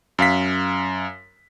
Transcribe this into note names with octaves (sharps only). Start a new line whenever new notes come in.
F#2 F5 B6